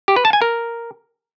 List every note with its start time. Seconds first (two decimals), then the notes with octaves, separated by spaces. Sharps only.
0.08 G4
0.16 B4
0.25 A5
0.33 G#5
0.42 A#4